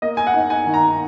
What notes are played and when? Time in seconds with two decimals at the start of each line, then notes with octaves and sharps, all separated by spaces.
0.02 A#3 D#5
0.17 G#5
0.27 F#5
0.34 D#4
0.50 G#5
0.66 D#3
0.74 A#5